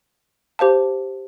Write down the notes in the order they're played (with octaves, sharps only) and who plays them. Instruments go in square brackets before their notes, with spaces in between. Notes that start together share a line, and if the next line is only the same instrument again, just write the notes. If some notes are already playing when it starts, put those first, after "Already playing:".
[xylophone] G4 C5 F5 A5